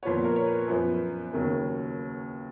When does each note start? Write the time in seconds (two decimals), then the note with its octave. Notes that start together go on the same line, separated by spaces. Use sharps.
0.03 A#2 F3 B3 C#5
0.24 A#4
0.36 C#5
0.46 B4
0.68 F#2 F3 B3
1.32 D#2 C#3 F#3 A#3